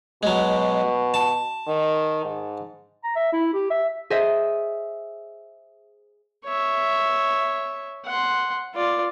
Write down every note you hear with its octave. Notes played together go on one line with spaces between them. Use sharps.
B2 F#3 G#3
A5
D#3
G#2
A#5
E5
E4
G4
E5
G#4 C5 D#5 E5
C#5 E5
F#5 C6
F4 D5